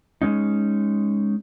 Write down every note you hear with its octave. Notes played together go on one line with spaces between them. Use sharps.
G#3 C#4 D#4